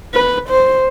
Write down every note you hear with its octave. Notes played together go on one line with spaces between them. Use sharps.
B4
C5